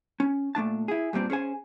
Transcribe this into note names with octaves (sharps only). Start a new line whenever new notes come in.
C#4
A#2 A3 D4 A5
E4 G#4
G2 A#2 G3 C4 D4
C#4 G#4 C5 G#5